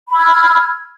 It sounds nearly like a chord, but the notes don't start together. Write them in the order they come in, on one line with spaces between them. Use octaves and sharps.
B5 E6 G#6 F6